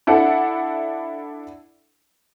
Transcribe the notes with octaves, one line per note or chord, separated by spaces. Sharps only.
D4 E4 A4 F#5